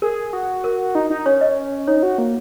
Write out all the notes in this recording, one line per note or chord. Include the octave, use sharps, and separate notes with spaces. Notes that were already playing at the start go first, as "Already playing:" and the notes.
G#4 A#4
F#4
A#4
D#4
D#4
C#4 C#5
D#5
D#4 C#5
F#4
A#3